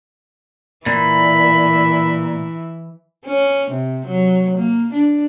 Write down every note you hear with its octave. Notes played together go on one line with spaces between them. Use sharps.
A#2 E3 E4 B5
C#4
C3
F#3
A#3
D4